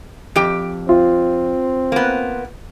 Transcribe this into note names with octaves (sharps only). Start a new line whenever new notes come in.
F2 G4 G5
C4 F4
A#3 B3